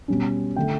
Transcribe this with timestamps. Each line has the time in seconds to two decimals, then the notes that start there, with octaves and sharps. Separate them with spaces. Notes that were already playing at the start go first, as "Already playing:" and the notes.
0.08 B2 G3 C#4
0.56 D3 A3 G5